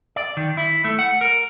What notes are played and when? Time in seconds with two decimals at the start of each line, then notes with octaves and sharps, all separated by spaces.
0.16 D5
0.37 D#3
0.57 E4
0.84 A3
0.99 F#5
1.21 A#4